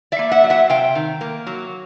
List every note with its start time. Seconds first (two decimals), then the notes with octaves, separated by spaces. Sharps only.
0.12 D5 E5
0.19 A#3
0.32 E5 F#5
0.44 F#3
0.50 E5 F#5
0.69 C3 F5 G5
0.95 D#3
1.21 A#3
1.47 F#3